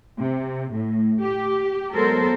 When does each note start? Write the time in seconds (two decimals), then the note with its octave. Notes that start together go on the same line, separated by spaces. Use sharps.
0.19 C3
0.70 A2
1.21 G4
1.95 F#3 G#3 B3 A4 A#4 C5